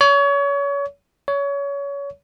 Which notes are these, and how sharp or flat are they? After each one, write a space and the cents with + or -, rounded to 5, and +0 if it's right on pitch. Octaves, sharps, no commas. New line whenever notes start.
C#5 +30
C#5 +25